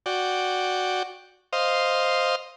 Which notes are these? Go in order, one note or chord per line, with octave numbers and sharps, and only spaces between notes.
F#4 D5 G5
C5 D#5 F5